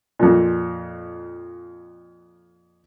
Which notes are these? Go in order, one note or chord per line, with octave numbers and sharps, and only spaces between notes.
F2 A#2